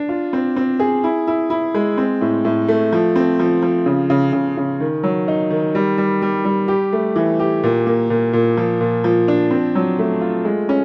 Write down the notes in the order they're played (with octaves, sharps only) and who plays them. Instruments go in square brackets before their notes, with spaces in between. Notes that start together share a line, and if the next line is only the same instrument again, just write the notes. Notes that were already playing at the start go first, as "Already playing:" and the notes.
Already playing: [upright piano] D4
F4
C4
C4
G#4
E4
E4
E4
G#3
C4
A2
A2
A3
F3
C4
F3
F3
C#3
C#3
C#3
C#3
D#3
F#3
D#4
D#3
G3
G3
G3
G3
G4
A3
E3
G4
A#2
A#3
A#2
A#2
F3
A#2
F3
D4
C4
F#3
A3
F4
G#3
C#4